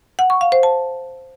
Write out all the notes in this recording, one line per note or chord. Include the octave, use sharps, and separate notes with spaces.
F#5
C#6
F5
C5
A5